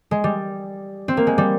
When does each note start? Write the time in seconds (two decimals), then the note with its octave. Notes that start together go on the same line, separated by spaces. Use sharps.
0.11 G#3
0.24 G3
1.08 C4
1.17 A#3
1.27 G#3
1.38 G3